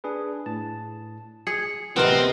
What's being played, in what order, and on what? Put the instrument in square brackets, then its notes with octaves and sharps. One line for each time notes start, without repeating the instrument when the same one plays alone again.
[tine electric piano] D4 G#4 B4
A2 A5
[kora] G#4 [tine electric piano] C#7
[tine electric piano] A1 D2 [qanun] C3 D#5 [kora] B3 A#4 [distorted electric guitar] C4